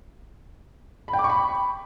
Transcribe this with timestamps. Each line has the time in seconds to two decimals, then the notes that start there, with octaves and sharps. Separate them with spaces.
1.08 B5
1.13 G5
1.19 D6
1.24 C#6
1.29 B5